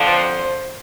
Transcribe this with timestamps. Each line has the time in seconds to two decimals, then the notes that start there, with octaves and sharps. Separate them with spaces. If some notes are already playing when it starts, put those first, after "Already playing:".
Already playing: F2 D3 F3
0.09 C5